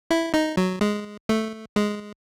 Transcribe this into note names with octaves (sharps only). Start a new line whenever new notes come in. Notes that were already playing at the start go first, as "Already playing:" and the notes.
E4
D#4
F#3
G#3
A3
G#3